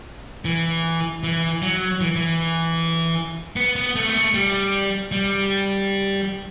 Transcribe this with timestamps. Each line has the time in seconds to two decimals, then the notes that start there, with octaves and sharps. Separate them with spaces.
0.45 E3
1.23 E3
1.62 F#3
2.01 E3
2.16 E3
3.56 B3
3.76 B3
3.95 A3
4.09 B3
4.14 A3
4.34 G3
5.12 G3